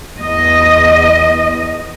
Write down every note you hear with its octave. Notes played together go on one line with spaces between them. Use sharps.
E2 D#5